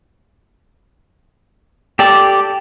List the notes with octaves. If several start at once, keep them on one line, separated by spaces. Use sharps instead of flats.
G4 A4 D5